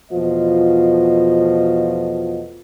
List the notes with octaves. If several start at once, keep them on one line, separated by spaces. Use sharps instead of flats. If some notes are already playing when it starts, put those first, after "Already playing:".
E2 B2 F3 A3 F4 D#5